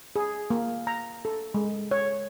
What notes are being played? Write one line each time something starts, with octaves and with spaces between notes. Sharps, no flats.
G#4
A#3
A#5
A4
G#3
C#5